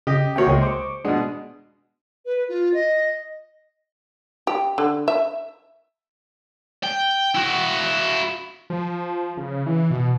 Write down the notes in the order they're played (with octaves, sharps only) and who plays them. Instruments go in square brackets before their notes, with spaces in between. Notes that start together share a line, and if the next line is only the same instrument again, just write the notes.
[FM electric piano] C#3 [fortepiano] G4 D#5
[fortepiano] C3 A#3 C#5 [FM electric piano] F#4 G5
[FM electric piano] C#2 [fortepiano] G#3 A#3 G#4
[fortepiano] C5 [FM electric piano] C#6 D6
[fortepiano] B2 G#3 [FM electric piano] D4 F#5
[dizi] B4
F4
D#5
[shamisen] G4
D3
E5
[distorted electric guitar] G5
E4 F#4
[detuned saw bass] F3
C#3
E3
B2